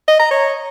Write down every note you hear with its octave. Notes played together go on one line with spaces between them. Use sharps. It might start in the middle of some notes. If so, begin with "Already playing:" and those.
D#5
A#5
C#5